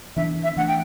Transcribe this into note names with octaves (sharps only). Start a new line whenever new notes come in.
E3 B3 D4 E5
E5
E3 A3 D4 F#5
G5